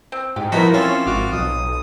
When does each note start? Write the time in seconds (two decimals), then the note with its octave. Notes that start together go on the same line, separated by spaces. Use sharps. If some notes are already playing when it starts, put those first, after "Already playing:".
0.12 C4
0.36 G#2 G4
0.52 F3 B3 D#4 E4 F#4 A#4
0.74 F3 C4 C#4 A4
1.06 G#1 F#4 D6 F6
1.32 B1 D#6